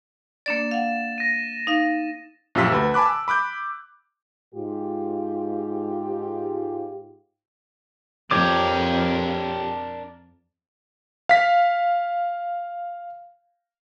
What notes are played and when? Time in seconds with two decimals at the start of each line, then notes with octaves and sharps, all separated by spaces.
0.46 A#3 D4 D5 A6 E7
0.71 F5 F#5
1.18 A#6 D#7
1.67 D#4 F5
2.55 A#1 F#2 F4 G4 E6 B6
2.72 D2 B4 B5
2.94 G#5 A5 B5 D6 F#6
3.05 E6
3.28 B5 D6 F#6 G6
4.55 G#2 F4 G4
8.31 F2 D4 G4 A#4 C#5 D6
11.29 F5 B6